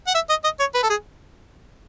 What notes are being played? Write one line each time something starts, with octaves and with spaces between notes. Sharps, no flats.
F#5
E5
D#5
D#5
C#5
B4
A4
G#4